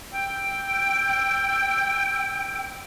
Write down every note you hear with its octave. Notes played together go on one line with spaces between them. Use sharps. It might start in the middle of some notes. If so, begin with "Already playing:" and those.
G5 E6